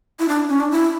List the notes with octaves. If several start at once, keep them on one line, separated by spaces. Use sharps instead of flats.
E4
D4
C#4
D4
E4